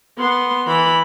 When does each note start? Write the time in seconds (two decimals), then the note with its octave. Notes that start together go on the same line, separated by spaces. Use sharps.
0.18 B3 C6
0.67 E3 B5